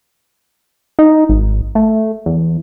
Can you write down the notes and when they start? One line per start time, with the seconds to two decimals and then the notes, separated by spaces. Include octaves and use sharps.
0.99 D#4
1.29 G#1
1.75 A3
2.26 E2